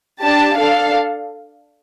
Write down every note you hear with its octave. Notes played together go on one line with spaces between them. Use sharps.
D4 G4 A5
D4 A4 F5